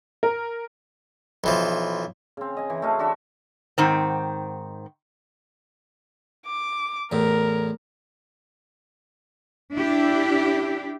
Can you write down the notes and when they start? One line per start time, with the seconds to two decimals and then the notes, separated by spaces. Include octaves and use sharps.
0.23 A#4
1.44 B1 E3 F3
2.37 C#3 C4
2.57 D#5 G#5
2.70 E3
2.82 A3 F#4 D#5 F5
2.99 D4 F#4 E5
3.78 G#2 D#3 C4
6.46 D6
7.12 E2 A2 A#4
9.74 D4 E4 G4